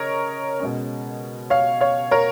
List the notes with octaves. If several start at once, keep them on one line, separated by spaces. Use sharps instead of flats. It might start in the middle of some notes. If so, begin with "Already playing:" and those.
Already playing: C#3 A#4 C#5 D#5
B2 G#3 C#4
C#5 F5
C#5 F5
A#4 C#5